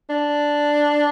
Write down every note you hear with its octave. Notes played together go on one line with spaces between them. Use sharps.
D4